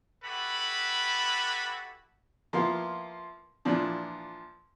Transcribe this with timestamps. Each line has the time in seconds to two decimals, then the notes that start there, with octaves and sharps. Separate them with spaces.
0.24 E4 F#4 G4 A4 B4 B5
2.53 F3 A#3 B3 E4 F4
3.65 A#2 E3 F3 D4